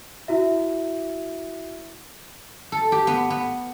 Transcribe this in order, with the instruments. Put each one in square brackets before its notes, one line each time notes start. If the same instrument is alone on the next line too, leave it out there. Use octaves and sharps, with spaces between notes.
[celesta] E4 F#4 E5
[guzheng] A4
G4
B3
B3